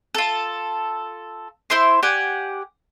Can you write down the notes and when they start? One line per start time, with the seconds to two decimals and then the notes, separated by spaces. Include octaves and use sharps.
0.15 F4 A4
1.70 E4 C5 E5 C6
2.03 G4 D5 F#5 G#5